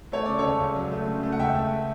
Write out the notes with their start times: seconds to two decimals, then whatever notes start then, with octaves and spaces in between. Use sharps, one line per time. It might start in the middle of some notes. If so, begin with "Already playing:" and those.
0.12 A3 C#5
0.26 C#3 D5
0.38 A4 C#5
0.44 C#2
0.60 C#2
0.76 F#3
0.92 A3
1.07 C#3
1.23 A3
1.32 F#5
1.39 C#2 E5 G5
1.55 A3